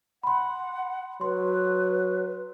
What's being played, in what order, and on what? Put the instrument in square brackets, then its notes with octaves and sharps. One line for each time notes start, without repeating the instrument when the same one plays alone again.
[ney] F#5 [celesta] B5 C6
[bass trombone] F#3 [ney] B4 [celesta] C6